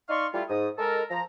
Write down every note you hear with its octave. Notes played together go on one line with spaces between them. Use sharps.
D#4 D5 D#5 F5 C6 C#6
G3 A3 E4 F4
G#2 D#6
G#3 A4 A#4
F3 A#5